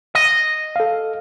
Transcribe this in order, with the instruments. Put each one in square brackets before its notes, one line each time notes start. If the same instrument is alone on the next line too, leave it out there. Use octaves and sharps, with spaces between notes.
[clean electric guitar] D#5
[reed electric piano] A4 F5